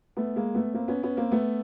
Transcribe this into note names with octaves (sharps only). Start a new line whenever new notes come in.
A3 B3
G#3 A#3
A3 B3
A#3 C4
B3 C#4
B3 C#4
A#3 C4
A3 B3